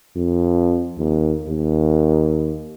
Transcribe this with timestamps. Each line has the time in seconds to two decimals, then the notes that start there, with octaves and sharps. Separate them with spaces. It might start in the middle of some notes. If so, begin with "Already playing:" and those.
0.16 F2
0.98 D#2
1.48 D#2